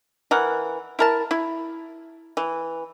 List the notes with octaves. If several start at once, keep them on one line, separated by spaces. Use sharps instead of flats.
E3 A#4 F#5
E4 A#4 A5
E4
E3